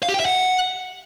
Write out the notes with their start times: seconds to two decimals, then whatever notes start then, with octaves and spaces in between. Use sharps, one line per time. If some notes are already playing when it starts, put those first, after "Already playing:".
0.03 F5
0.09 G4
0.14 G5
0.20 E5
0.25 F#5